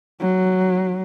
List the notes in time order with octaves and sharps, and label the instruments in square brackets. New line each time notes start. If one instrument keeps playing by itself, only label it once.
[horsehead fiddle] F#3